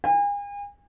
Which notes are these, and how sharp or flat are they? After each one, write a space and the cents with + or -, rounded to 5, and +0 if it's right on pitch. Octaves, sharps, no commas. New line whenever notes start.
G#5 -40